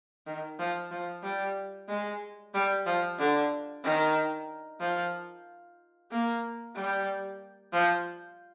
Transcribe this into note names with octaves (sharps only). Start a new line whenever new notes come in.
D#3
F3
F3
G3
G#3
G3
F3
D3
D#3
F3
A#3
G3
F3